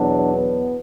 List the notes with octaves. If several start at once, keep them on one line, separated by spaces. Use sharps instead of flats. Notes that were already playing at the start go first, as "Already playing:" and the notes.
Already playing: E2 B2 F#3 D4
B3